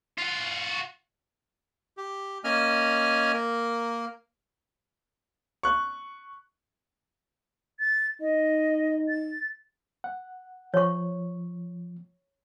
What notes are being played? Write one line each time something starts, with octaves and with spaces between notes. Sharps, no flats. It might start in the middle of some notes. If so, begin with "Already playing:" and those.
F4 F#4
G4
A#3 C#4 D#5 G#5 F6
A#3 A#4
C#6 F#6
A6
D#4 D#5
A6
F#5
F3 C#5 C#6